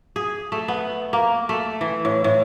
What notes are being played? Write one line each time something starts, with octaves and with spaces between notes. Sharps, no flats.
G#4
A3
B3
A#3
A3
E3
A2
A2